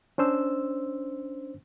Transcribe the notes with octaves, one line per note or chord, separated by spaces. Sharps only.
C#4 D4 C5 E6